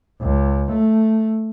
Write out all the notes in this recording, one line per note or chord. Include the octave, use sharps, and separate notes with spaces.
C#2
A3